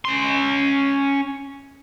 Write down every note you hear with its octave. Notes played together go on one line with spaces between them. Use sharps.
C#4 C6